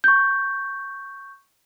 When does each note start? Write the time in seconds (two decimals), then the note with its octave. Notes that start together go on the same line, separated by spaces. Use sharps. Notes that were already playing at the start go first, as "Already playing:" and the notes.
0.04 C#6 G6